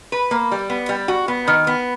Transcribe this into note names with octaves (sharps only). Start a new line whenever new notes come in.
B4
A#3
G3
B3
G3
F#4
B3
D#3
B3